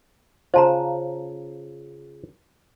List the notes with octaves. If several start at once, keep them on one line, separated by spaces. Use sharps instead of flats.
C#3 F4 C5 A5 A#5